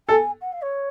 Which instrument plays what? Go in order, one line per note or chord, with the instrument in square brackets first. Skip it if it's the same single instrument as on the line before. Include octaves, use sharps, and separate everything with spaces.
[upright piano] A4 [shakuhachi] G#5
[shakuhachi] F#5
F5
C#5